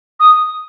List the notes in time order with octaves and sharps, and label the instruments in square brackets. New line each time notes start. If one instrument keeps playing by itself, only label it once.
[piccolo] D#6